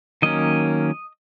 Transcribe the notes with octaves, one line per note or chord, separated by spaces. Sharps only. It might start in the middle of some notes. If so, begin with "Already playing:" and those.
D#3 F#3 A#3 C#4 D#5